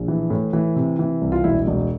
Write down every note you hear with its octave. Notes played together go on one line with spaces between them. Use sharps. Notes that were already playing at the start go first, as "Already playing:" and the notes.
Already playing: A#1
E3
A2
E3
C3
E3
C2
F4
E1 E4
E1